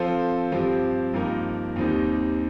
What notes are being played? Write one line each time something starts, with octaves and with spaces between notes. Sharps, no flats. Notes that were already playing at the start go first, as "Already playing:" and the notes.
Already playing: F3 C4 F4 A4 C5
G2 F3 C4 G4
G2 F3 A#3 D#4 A#4
D#2 D#3 G3 C4 D#4